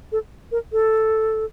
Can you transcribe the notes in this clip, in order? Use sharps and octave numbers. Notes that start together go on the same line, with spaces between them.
A4
A#4
A4